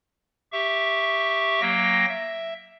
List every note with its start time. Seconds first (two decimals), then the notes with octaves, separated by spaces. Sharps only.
0.52 G4 E5 C#6
1.61 F#3 A#3 G5 A#6
2.09 E5